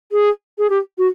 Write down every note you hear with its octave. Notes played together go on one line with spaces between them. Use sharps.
G#4
G#4
G4
F#4